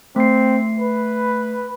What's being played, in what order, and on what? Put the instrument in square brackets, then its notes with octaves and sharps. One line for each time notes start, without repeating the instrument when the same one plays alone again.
[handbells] A3 C7 [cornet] C4
[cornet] B4